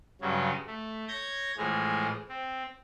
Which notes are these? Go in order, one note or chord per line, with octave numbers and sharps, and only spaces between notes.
G2 C#3 F#3 C#4
A3
C#5 G6 G#6 A#6
A2 E3 F3 G#3 G#4
C4